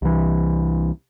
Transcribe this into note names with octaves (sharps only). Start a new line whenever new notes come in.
C2 E3